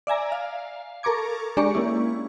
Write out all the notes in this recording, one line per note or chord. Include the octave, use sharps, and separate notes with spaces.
D5 E5 G#5 A#5
F5
A4 A#4 A#5 C#6 D6 G#6
G#3 D4 G4 D5 A#5 C#6
A#3 C#4 E4